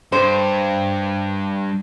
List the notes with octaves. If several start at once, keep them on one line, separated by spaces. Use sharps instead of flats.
G2 C5